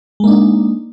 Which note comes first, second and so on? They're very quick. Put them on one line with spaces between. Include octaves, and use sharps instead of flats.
G#3 A#3 D4 D#4